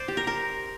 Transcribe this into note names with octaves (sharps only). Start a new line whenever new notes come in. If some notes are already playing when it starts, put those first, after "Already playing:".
Already playing: C5 D5
G4
A#4
A#4